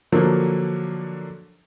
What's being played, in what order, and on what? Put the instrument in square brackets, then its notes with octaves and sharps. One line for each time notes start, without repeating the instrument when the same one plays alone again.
[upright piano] D3 F3 F#3 A#3